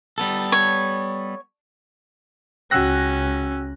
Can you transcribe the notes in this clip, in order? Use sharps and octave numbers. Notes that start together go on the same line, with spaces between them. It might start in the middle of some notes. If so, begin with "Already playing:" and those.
G3 B3 A4
C#5
C#2 C#4 F#4 F#5 G5 E6 F#6 A#6